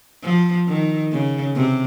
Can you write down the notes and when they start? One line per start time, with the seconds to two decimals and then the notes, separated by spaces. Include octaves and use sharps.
0.23 F3
0.67 D#3
1.11 C#3
1.55 C3